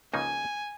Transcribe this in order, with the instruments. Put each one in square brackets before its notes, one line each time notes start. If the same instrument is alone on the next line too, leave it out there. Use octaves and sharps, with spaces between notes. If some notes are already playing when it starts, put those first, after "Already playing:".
[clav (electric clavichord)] C#2 C#3 F3 A#3 D#4 [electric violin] G#5